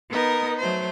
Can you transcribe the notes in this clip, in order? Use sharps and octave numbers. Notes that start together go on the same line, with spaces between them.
B3 D#4 A#4 D#5
F#3 A3 C5